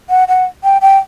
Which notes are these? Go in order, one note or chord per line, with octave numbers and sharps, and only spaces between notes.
F#5
F#5
G5
G5